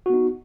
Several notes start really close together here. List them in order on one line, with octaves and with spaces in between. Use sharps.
F#4 B3 D#4